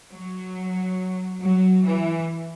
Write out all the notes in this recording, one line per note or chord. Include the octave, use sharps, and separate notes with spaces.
F#3
F#3
E3